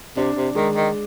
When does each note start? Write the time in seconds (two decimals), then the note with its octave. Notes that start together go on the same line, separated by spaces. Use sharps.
0.17 C3 D4
0.36 C3
0.55 D#3 G#3
0.76 D#3